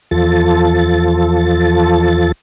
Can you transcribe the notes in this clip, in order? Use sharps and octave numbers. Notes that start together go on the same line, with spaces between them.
E2 F3 F4 A4 A6